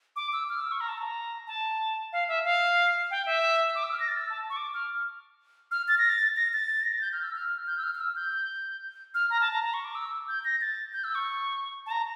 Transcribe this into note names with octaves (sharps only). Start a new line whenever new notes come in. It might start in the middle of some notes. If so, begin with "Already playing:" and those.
D6
E6
F6
E6
C#6
A#5
A5
A#5
A5
F5
E5
F5
G5
E5
D6
E6
F6
A#6
A6
E6
A5
C#6
D6
F6
F6
A6
A#6
A6
A#6
A6
A#6
A6
G6
F6
E6
F6
G6
E6
F6
F6
E6
G6
F6
A#5
A5
A#5
A#5
C#6
D6
E6
G6
A#6
A6
G6
E6
C#6
A5
A#5